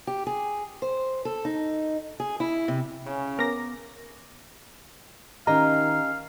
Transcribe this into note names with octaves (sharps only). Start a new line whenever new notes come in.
G4
G#4
C5
A4
D#4
G#4
E4
C3
C#3 C#4
B3 A#4 D6 A#6
D#3 C#4 G4 D#5 F5 A#5